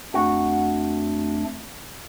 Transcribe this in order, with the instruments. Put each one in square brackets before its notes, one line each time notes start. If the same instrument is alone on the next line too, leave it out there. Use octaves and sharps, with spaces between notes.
[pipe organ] F2 A3 D4 [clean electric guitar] F#4